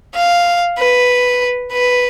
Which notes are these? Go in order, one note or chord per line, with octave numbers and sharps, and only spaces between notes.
F5
B4
B4